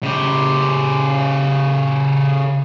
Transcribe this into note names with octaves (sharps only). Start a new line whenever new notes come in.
C#3 G4